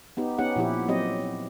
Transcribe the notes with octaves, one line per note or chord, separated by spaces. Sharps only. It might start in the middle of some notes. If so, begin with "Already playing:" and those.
B3 D#4 G4
B3 C#4 D#4 G4 F#5
A#2 F3 E4 G4
F#3 C4 G4 D#5